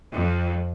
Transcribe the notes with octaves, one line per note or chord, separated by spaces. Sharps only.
F2